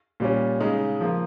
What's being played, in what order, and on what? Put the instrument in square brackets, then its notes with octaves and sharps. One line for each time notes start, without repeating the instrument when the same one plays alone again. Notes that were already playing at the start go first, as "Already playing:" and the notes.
[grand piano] A#2 G3 C#4
C#3 G#3 D#4
F3 A#3 F4